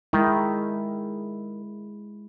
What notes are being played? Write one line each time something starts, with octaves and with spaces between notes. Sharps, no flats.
D#3 G#3 E4